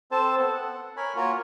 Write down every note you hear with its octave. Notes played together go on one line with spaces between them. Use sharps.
C4 A4 C5 A5
B3 A4
F#5
A#4 C#5 G#5 B5
A#3 F4 F#4 A#4 C#5